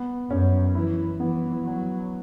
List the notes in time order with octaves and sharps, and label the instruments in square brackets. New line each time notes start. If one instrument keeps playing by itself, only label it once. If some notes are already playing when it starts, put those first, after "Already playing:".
Already playing: [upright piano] B3
[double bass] F#2 [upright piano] C#4
[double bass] E3 [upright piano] E4
[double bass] E3 [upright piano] B3
[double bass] F#3